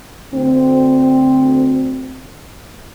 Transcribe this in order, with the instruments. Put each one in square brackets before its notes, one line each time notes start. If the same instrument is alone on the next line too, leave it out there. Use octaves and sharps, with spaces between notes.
[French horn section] D2 C4